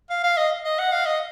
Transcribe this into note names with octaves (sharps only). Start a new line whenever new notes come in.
F5
F5
D#5
D#5
F#5
F5
D#5